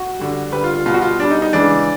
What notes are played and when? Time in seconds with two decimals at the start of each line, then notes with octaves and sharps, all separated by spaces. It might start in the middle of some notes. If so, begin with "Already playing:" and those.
Already playing: F#4
0.19 D3 G3
0.52 D3 G3 B4
0.63 F4
0.75 F4
0.86 B2 F4
0.89 G3
0.94 F#4
1.02 F4
1.20 B2 G3 D4
1.31 D#4
1.42 D#4
1.53 C#3 E3 G#3 D4